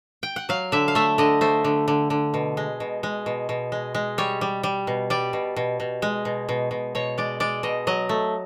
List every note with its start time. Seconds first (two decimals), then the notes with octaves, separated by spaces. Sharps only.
0.23 G5
0.36 F#5
0.49 F#3 F5
0.72 D3 E5
0.88 F5
0.95 A3 E5
1.18 D3 D#5
1.41 A3 C5
1.64 D3
1.88 D3
2.10 D3
2.34 B2
2.57 G#3
2.80 B2
3.03 G#3
3.26 B2
3.49 B2
3.72 G#3
3.95 G#3
4.18 G3 C#5
4.41 G3
4.63 G3
4.87 B2
5.10 G3 D5
5.33 B2
5.56 B2
5.80 B2
6.02 G#3
6.25 B2
6.49 B2
6.71 B2
6.95 B2 C#5
7.18 G#3 D5
7.40 G#3 D5
7.63 B2 D#5
7.87 F#3 D#5
8.09 A3